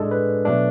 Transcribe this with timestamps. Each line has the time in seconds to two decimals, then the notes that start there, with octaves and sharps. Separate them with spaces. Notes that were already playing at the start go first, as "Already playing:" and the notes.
Already playing: A2 G#3 D4 A4
0.11 B4
0.45 B2 F#3 A3 D4